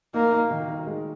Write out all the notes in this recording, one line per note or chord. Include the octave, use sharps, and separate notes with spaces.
A#3 D#4
D#4
D#3
D#4
G#3